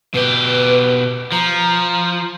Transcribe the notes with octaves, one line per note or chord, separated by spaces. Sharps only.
B2 G4 B4
F3 A#5